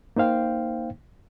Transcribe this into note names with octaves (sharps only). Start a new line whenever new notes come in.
A#3 D#4 C5 F5 G5